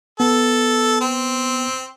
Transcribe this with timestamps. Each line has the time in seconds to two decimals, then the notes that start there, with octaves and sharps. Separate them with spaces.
0.20 B3 A4
1.01 C4